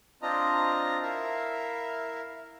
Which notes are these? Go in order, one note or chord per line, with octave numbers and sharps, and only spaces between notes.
C4 D4 F4 D#5 A#5
E4 A#4 E5 F5